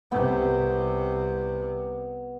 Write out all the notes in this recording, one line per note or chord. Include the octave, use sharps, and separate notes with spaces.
C2 C3 B3